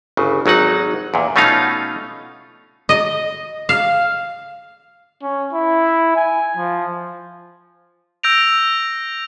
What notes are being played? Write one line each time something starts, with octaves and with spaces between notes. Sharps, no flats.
G1 C#3
G#1 F#3 D#4 F#5
E2 A#2
B2 A3 C#4 D#4 F4 F5
D#5
F5
C#4
E4
G#5
F3
E6 G6 A#6 D7 F7